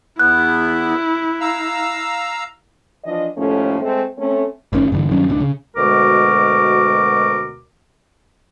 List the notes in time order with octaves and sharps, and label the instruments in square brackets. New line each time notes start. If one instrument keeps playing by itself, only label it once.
[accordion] E2 B3 [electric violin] E4 [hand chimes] F#6
[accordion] F5 A#5 E6
[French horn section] E3 F3 D4 D#5
D#2 A2 F3 A3 C#4
G#3 A3 C4
A3 C4 C#4
[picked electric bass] G1 D2 D#3 C#4
G2 D3 E3
G2 D#3 F#3 C#4
C#2 G#2 C#4 D4
C#3
[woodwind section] D2 B2 G#3 F#4 A#4 D6